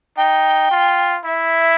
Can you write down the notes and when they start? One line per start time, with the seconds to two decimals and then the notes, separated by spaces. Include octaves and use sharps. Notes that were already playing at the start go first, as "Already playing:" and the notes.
0.17 D#4 G5
0.71 F4
1.25 E4 E5